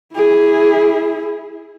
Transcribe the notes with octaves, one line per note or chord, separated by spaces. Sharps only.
E4 G#4